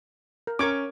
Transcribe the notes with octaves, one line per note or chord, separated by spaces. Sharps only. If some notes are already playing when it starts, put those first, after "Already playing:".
A#4
C#4 A#4 C#6 D6 G#6